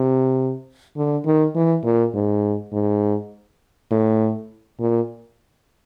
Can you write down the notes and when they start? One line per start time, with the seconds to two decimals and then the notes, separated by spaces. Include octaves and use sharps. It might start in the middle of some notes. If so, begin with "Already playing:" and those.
Already playing: C3
0.97 D3
1.25 D#3
1.55 E3
1.85 A#2
2.14 G#2
2.73 G#2
3.91 A2
4.79 A#2